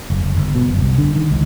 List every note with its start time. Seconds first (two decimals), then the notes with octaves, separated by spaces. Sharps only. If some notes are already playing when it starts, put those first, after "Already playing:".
0.10 F#1
0.24 F#1
0.36 G1
0.55 B2
0.68 F#1
0.81 C2
0.98 D3
1.16 D#3
1.31 C#2